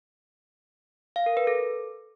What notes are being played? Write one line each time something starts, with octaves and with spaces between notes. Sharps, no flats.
F5
A#4
B4
A4